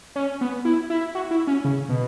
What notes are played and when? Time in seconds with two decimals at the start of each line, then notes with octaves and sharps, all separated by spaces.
0.16 C#4
0.41 B3
0.65 E4
0.90 E4
1.15 F#4
1.31 E4
1.47 C#4
1.64 C#3
1.89 B2